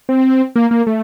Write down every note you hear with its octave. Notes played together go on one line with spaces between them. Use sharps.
C4
A#3
A#3
A3